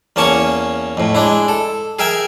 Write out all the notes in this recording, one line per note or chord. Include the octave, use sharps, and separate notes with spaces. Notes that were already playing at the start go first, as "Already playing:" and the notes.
E2 A#3 C#4 A5 C#6 D#6
F2 A2
G#3 D4 E4
A4
G#4 A#4 E5 G5 G#5